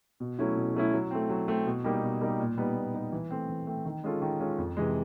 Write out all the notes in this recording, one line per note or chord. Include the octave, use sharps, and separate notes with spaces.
B2
F#3 A3 C#4 E4
B2
F#3 A3 C#4 E4
F#3
A3 C4
F#3
A3 C4
B2
G3 A#3 D#4 G4
B2
G3 A#3 D#4 G4
A#2
G3 B3 D#4
A#2
G3 B3 D#4
E3
A3 C4
E3
A3 C4
D#3
G#3 C#4 F4 A4
D#3
G#3 C#4 F4 A4
F2
C3 E3 G#3